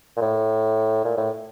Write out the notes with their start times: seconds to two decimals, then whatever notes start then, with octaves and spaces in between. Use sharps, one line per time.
0.16 A#2
0.21 A2
1.04 A#2
1.17 A2